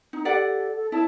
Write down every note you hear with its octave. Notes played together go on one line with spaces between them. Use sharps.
D#4
G4 A4 D5 F#5
A4
E4 C#5 A5